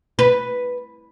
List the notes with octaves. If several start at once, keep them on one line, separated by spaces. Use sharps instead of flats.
B4